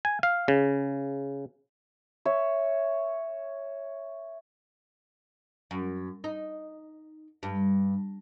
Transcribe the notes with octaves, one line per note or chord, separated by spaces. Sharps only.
G#5
F5
C#3
C#5 E5
F#2
D#4
G2